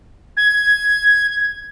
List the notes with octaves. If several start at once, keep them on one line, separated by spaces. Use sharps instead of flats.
G#6